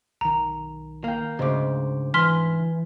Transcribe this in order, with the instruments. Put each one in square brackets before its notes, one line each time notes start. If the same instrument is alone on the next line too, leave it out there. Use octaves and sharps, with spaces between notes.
[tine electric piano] B1 D#3 [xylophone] A#5
[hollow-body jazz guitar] A#3 [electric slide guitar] F5 G5
[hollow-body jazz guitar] D2 G#2 [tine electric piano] C#3 C5 D6
[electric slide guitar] E3 [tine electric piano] B4 G#5 [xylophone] C6 F6 B6